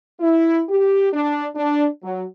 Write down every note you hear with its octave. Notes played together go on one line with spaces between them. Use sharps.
E4
G4
D4
D4
F#3